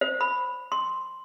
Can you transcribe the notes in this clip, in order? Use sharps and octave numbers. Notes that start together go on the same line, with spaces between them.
C5
B5
C6